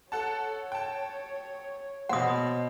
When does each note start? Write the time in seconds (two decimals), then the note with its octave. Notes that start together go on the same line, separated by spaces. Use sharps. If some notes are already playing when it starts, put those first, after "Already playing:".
0.12 A4 C#5 F#5 A5
0.72 G5 A5
2.09 B2 C5 F#5 D#6